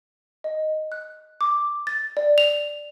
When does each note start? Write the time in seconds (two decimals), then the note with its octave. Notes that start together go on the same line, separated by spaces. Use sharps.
0.44 D#5
0.92 F#6
1.41 D6
1.87 A6
2.17 D5
2.38 F7